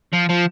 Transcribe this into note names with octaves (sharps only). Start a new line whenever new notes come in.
F3
F3